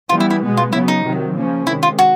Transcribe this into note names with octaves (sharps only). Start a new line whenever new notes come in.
E3 G3 B3 F4
E4
E4
B2 G#3 B3
F4
C#3 F#3 B3 E4
D#4
C3 D#3 F#3
C#3 F3 A#3 C#4
C3 D#3 G#3 E4
F4
F#4